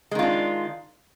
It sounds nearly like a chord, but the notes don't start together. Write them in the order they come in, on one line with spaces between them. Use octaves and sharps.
G#3 D#3 F4 D4